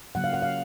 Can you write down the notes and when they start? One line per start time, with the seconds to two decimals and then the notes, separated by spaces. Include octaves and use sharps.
0.15 C#3 F#3 A#3 F#5
0.24 F5
0.34 F#5
0.42 F5